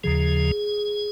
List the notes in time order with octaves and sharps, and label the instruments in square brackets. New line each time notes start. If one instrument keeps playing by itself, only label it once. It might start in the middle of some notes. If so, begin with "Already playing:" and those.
[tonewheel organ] D#2 C#3 F3 G#4